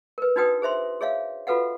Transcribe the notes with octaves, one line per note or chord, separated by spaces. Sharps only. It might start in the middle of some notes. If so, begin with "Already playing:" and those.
A#4 B4
D4 D#4 F#4 B4 G5 D#6
G#4 C5 E5 C6
G#4 C#5 E5 F5
F4 F#4 A4 B4 F5 F#5